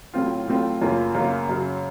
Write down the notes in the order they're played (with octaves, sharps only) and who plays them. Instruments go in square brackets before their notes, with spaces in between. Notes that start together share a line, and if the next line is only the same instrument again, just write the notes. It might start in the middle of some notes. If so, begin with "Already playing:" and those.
[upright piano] A2 F#3 A3 C4 F4
A2 F#3 A3 C4 F4
F#2 C#3 F3 A#3 F4
F#2 C#3 F3 A#3 F4
F#2 C#3 F#3